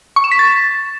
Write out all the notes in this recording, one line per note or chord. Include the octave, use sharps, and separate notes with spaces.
C#6
E7
B6
A6